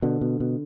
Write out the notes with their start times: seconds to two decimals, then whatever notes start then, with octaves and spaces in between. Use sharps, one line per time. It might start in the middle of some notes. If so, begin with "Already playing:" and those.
0.02 B2 D3
0.21 B2
0.40 B2